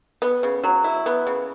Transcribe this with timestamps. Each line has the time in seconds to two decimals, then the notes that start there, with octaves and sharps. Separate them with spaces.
0.22 B3
0.43 C#3
0.64 F#3
0.84 E4
1.06 B3
1.27 C#3